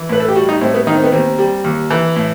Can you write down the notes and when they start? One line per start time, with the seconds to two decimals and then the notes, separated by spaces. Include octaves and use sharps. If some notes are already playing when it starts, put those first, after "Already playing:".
Already playing: E3
0.09 A2 B4
0.20 A4
0.28 G4
0.36 G3 F#4
0.49 D#4
0.61 A2 C4
0.74 B3
0.87 D#3 D#4
0.95 C4
1.04 B3
1.12 D#2 C4
1.38 G3
1.64 D#2
1.91 E3
2.16 A2